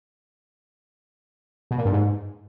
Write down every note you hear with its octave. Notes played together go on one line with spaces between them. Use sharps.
B2
A#2
G2
G#2